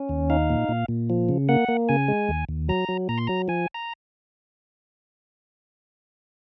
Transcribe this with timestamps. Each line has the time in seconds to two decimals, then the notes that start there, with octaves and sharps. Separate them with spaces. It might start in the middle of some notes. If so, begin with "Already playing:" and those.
Already playing: C#4
0.09 D#2
0.30 D#4 F5
0.50 A#2
0.69 A#2
0.89 A#2
1.10 F3
1.29 C#3
1.49 A#3 F#5
1.68 A#3
1.89 C#3 G#5
2.08 G#3
2.29 D#2
2.49 D#2
2.69 F#3 A#5
2.89 F#3
3.09 A#2 A#5
3.18 C6
3.27 F#3 A#5
3.48 F3 G#5
3.74 A#5